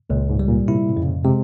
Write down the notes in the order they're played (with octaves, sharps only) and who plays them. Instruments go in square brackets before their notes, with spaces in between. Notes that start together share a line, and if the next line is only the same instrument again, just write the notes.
[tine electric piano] C#2 [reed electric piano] A#2
[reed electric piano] G#2
[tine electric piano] G3
[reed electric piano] A#2
[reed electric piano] C3 [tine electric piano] E4
[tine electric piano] F2 [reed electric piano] C#3
[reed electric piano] C3 [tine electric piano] G#3